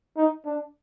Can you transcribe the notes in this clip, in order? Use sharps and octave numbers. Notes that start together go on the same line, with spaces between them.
D#4
D4